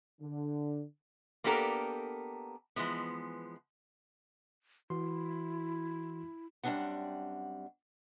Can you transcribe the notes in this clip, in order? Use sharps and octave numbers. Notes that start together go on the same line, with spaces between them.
D3
A#3 B3 D4 G4 A4 A#4
E3 F3 G#3 B3
E3 E4 F#4 C6
F#2 G3 C4 D4 G#4 F#5